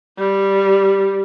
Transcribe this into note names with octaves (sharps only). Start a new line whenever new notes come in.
G3